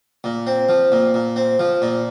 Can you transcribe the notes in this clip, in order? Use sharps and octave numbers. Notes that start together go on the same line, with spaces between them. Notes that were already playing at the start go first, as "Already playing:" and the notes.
A#2
C4
F3
A#2
A#2
C4
F3
A#2